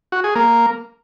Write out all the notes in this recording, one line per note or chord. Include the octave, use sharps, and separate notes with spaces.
F#4
G#4
A#3